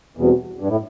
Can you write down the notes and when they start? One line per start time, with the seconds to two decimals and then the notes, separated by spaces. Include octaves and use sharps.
0.17 E2 B2 G3 C4 F#4
0.60 G2
0.68 A2